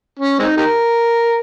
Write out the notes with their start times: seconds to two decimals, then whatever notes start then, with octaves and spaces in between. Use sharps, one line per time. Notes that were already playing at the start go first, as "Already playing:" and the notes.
0.19 C#4
0.39 G#3 C4 D#4
0.57 D#4 G4 A#4